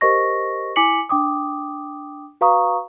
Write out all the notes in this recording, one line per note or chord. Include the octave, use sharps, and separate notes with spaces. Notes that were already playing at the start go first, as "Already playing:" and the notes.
G4 A#4 C5 D#5 C#6 A#6
E4 G#5 D6 B6 C#7 F#7
D4 G5 D6 D#6
F#4 B4 F5 A#5 C#6 D#6